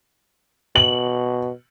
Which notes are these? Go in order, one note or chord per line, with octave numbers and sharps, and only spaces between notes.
B2 F#7